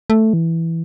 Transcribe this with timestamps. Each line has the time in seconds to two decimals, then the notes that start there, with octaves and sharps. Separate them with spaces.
0.10 A3
0.33 E3